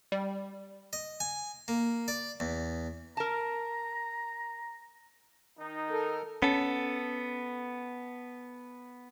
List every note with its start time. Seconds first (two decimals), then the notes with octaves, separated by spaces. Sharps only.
0.12 G3
0.93 D#5
1.20 G#5
1.68 A#3
2.08 D5
2.40 E2
3.17 A#4 A5 A#5
5.59 D#3 D#4
5.91 A4 A#4
6.42 B3 C#4 A4